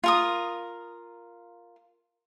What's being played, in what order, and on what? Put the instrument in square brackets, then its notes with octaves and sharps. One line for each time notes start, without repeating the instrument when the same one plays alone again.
[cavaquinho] F4 A#4 D#6